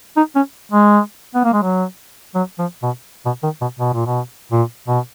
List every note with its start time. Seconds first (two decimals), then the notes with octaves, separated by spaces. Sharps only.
0.17 D#4
0.36 C#4
0.72 G#3
1.35 B3
1.44 A#3
1.53 G#3
1.62 F#3
2.35 F#3
2.59 F3
2.83 B2
3.26 B2
3.43 D#3
3.61 B2
3.80 B2
3.94 A#2
4.06 B2
4.52 A#2
4.88 B2